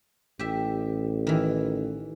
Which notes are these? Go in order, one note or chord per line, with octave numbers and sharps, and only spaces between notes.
A1 G4 E5
D#3 E3